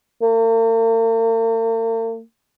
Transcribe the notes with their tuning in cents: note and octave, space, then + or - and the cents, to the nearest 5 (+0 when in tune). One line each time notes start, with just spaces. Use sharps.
A#3 -45